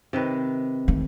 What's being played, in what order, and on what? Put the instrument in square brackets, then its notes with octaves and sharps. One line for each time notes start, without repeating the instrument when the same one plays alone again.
[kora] C3 D#3 B4
[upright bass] D#3 A3